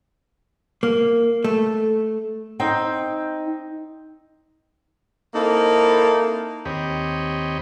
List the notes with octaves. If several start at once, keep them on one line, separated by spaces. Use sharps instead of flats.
A#3
A3
C4 D#4 G5
A#3 C4 D#4 E4 A4
D#2 C4 G4 C#5 D#5 B5